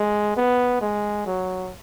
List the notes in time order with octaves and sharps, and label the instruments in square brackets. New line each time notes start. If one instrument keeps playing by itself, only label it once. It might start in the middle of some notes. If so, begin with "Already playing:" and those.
Already playing: [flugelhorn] G#3
B3
G#3
F#3